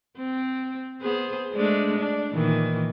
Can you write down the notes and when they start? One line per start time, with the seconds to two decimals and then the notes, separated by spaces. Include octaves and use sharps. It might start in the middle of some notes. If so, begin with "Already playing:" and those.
0.17 C4
1.02 B3 G#4 C5
1.54 G#3 A3 D4
1.98 D4
2.33 A#2 D#3 E3